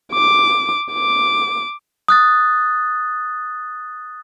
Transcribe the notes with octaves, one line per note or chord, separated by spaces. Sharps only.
D6
D6
D#6 F#6 A6